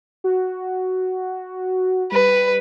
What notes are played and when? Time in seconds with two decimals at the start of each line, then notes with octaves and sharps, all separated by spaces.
0.24 F#4
2.12 G3 B4